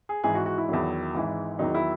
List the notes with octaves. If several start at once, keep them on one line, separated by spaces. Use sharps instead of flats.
G#4
G#1 G#2 E3 G#4
F#4
F#4
E4
E2 D#3 F#3
G#1 G#2 E3
E2 D#3 F#3 D#4
E4